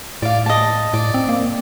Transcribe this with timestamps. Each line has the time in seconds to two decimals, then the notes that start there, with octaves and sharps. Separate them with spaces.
0.22 A2 D5 F5
0.46 D#5 A5
0.93 A2 D5
1.14 C4
1.29 A#3